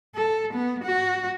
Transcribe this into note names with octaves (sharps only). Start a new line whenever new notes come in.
A4
B3
F#4